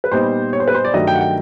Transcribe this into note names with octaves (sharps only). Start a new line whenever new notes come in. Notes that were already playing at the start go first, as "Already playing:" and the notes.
B4
A#2 G3 B3 D#4 C5
C#5
C5
B4
C5
D5
G2 D#3 F#3 A3 D#5
G5
F#5
G5